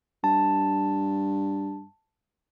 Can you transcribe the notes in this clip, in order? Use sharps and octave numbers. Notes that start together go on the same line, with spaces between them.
G2 A5